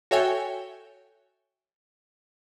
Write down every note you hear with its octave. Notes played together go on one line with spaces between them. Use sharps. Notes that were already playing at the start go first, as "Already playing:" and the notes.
F#4 A4 C#5 E5 G5 G#5